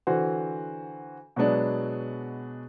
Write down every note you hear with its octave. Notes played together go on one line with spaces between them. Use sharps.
D3 E3 F#4 C5
B2 F#3 G#3 B3 D4 B4